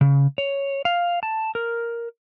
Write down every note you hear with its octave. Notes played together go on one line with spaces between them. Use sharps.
C#3
C#5
F5
A5
A#4